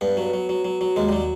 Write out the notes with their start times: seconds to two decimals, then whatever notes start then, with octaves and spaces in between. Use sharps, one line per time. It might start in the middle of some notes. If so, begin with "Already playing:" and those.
0.01 G2 B3
0.17 F#3
0.33 F#3
0.49 F#3
0.65 F#3
0.81 F#3
0.96 D#2 G#3
1.09 F#3 G3